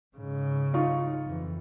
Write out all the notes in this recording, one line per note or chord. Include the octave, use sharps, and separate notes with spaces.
G#2 C#3
D#4 F4 C#6
F2 E3